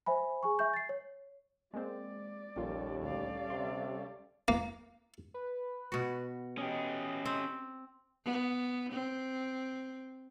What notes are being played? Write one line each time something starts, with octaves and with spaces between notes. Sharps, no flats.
C5 E5 G#5 B5
G#4 G#5 C#6
E5 G#5 C#6 G6
A6 C7
C#5
G#3 A#3 C4 D5
A#1 D#2 A#2 G3 C#4 F4 A4
D2 D5 F5
C3 C6
A#3
B4
B2 F#4
C#4 G4 D#5
C4
B3
C4